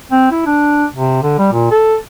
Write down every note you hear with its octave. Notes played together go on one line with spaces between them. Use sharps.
C4
E4
D4
C3
D3
G3
A#2
A4